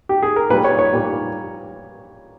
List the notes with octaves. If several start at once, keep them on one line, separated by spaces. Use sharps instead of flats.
G4
G#4
A#4
A#2 G3 B4
C#5
C#5
A#2 G3